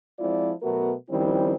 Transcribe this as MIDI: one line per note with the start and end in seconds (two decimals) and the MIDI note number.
0.19 0.51 53
0.19 0.51 56
0.19 0.51 60
0.19 0.51 64
0.19 0.51 65
0.19 0.51 74
0.63 0.92 47
0.63 0.92 54
0.63 0.92 57
0.63 0.92 59
0.63 0.92 66
0.63 0.92 70
1.10 1.54 51
1.10 1.54 53
1.10 1.54 55
1.10 1.54 60
1.10 1.54 61
1.10 1.54 64